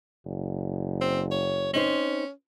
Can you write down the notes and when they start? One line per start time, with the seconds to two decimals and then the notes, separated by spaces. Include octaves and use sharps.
0.25 F#1
1.01 C4
1.32 C#5
1.74 C4 C#4 D#4 C5